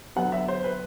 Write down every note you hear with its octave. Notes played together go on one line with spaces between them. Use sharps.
D3 F#3 B3 F#5
E5
C5
B4